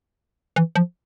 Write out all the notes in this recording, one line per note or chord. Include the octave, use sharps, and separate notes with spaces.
E3
F3